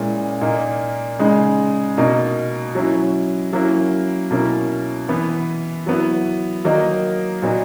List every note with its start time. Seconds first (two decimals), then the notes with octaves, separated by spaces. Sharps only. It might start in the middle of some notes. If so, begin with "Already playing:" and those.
Already playing: A#2 G#3 C#4 E4
0.41 A#2 A#3 D#4
1.19 C#3 G#3 D#4
1.97 B2 A#3 D#4
2.75 F#3 C#4 E4
3.53 F#3 A#3 C#4 E4
4.31 B2 A#3 C#4 E4
5.08 E3 B3 E4
5.86 F#3 B3 E4
6.64 D#3 F#3 A#3 D#4
7.42 A#2 F#3 B3 D#4